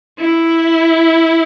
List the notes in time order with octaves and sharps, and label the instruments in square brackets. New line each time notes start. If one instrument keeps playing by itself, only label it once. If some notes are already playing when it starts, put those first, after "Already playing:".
[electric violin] E4